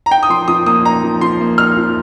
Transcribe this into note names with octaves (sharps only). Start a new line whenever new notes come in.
A#5
D#4 G5
D#6
F3 C6
F3 D#6
A#3 D#6
D#4 A#5
F3
F3 C6
A#3
D#4 F6
F3